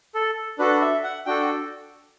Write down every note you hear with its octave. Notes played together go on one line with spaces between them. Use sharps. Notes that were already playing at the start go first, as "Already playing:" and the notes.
A4
D4 F#4 A4 B4
E5
F#5
D4 F#4 A4 G5